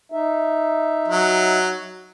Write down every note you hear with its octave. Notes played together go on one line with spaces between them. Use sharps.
D#4 E5
F#3